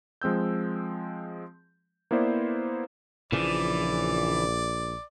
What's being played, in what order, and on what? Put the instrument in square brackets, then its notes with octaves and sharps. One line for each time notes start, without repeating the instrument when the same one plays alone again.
[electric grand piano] F3 G#3 C4 E6 G6
A#3 B3 E4 B4 C5 D5
[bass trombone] A#1 [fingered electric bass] A#2 C#3 F3 [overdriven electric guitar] E3 [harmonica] D5